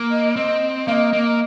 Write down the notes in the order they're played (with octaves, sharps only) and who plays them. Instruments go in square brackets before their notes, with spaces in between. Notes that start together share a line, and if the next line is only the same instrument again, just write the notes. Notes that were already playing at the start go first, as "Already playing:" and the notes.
Already playing: [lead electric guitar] A#3
[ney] D#5
[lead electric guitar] C4 [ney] D#5
[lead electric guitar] A#3 [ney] D#5 F5
[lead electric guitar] A#3